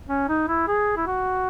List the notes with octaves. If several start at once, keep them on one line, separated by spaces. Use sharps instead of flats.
C#4
D#4
E4
G#4
E4
F#4